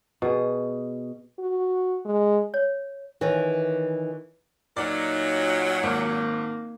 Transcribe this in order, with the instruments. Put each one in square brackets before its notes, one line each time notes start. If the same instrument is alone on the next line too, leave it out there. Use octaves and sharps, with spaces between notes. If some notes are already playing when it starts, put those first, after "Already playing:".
[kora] B2 G#4
[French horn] F#4
G#3
[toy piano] C#5
[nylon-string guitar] D#3 E3 C#4
[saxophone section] A#2 F#3 [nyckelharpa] D#4 [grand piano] D5
[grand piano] G#1 [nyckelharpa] A#3